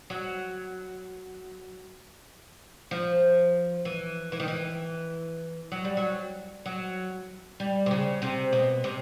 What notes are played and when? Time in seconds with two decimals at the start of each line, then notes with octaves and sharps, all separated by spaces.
0.10 F#3
2.91 F3
3.85 E3
4.32 E3
4.40 D#3
4.48 E3
5.72 F#3
5.85 G3
5.97 F#3
6.66 F#3
7.60 G3
7.86 C3
7.91 C#3
8.22 C3
8.53 B2
8.84 C3